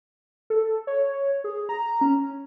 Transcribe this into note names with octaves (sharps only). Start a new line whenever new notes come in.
A4
C#5
G#4
A#5
C#4